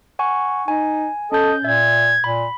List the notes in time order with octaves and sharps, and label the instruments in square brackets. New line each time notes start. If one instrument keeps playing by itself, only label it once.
[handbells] F#5 G#5 C#6
[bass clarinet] D#4 [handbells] G#5
[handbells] C#4 G6 [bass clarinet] A4 [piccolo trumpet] D#5
[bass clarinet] A#2 [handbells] E5 [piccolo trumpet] G#6
[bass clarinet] A#2 [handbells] B5